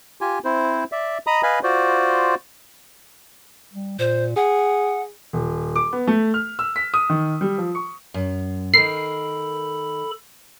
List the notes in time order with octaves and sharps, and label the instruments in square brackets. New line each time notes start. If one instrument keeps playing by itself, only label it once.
[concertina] F4 G4 G#5
C4 E4 C5
D5 E5
D#5 A#5 B5 D#6
B4 D#5 F5 G#5 B5
F4 F#4 C5 D5
[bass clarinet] G3
[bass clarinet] A#2 [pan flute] C5
[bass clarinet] G#4 [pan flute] F#5
[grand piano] D#1
D6
B3
A3
F6
E6
B6
D#6
D#3
G3
F3
C#6
[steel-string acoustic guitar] F#2
[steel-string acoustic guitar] D#3 A#4 [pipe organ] A4 B5 [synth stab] C7